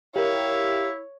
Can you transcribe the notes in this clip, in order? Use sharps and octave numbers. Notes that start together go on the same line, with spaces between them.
E4 G4 A#4 C#5 E5 F5